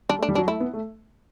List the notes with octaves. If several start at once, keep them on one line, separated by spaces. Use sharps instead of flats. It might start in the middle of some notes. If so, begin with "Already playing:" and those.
G3 D4
A3
D4
G3
F#3 D4
A3 E4
B3
A3